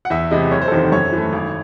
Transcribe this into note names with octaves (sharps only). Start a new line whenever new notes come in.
F#5
E2 E5
C3 E3 G#3 D#5
F#1 C#5
C5
A4
E2 C3 D#3 C5
F#2 C#5
E3 A3
G#1